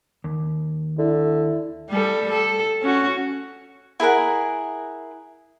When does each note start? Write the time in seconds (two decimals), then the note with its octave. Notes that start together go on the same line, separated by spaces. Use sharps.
0.24 D#2
0.98 D3 E4
1.90 G3 A4
2.31 A4
2.82 C#4 F#4
4.00 E4 G#4 A#4 F#5